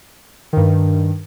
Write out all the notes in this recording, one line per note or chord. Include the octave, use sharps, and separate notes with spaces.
G2 D#3